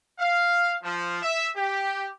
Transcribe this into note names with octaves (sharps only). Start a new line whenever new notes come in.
F5
F3
E5
G4